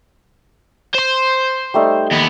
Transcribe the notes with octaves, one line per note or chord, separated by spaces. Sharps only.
C5 C6
G3 A3 D#4
D#2 B3